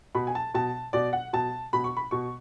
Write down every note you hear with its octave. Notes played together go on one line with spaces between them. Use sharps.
B2 B5
G#5
A5
B2 A5
B2 D5
F#5
B2 A5
B2 B5
C#6
B5
B2 C#6